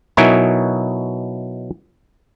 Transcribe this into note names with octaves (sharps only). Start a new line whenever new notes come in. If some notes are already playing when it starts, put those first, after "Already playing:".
B2 F#3 D#4 E4 A#4 G#5